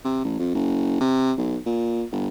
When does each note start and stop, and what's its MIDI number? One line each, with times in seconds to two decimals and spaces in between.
0.05 0.20 48
0.24 0.36 33
0.39 0.50 41
0.54 0.96 30
1.00 1.32 48
1.37 1.58 35
1.66 2.04 46
2.12 2.28 31